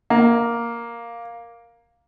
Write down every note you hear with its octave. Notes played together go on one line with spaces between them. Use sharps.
A#3